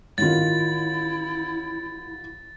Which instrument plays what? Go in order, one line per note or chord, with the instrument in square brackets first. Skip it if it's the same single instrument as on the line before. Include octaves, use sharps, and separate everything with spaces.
[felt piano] A1 D#3 F4 [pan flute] E4 [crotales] A6